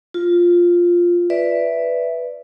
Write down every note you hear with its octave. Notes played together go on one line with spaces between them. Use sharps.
F4
B4 D5 E5